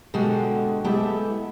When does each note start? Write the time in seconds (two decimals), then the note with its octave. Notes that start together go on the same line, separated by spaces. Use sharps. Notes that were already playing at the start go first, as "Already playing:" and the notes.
0.14 B2 D3 G#3 F#4 G4 A4
0.84 G#3 A3 B3 E4 G4 A4